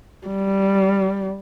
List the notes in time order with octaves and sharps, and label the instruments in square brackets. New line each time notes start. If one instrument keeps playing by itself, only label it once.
[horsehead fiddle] G3